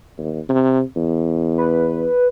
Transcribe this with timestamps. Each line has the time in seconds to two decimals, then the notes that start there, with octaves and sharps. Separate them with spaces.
0.18 D#2
0.49 C3
0.96 E2
1.58 B4